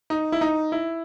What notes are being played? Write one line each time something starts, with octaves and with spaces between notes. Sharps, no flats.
D#4
E4
D#4
E4